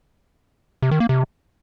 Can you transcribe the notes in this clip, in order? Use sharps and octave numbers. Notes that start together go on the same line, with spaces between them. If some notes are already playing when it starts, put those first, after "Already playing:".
C3
D#3
A#3
C3